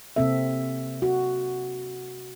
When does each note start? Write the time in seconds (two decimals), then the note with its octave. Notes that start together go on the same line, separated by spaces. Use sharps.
0.16 C3 A#3 C4 A4 E5
1.02 F#4